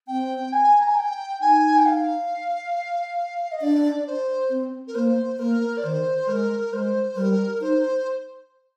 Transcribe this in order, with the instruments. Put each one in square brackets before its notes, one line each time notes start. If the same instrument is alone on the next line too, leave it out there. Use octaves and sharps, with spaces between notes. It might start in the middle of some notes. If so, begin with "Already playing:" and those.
[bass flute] C4 [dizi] G5
[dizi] G#5
A#5
G#5
G5
[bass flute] D#4 [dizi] G#5
[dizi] G5
F5
D#5
[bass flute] D4 [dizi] D5
[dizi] C5
[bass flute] C4
[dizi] A#4
[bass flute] A#3 [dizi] C5
[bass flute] A#3 [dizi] A#4
[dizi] D5
[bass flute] D#3 [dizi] C5
[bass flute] G#3 [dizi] A#4
[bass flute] G#3 [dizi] C5
[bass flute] G3 [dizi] A#4
[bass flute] D#4 [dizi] C5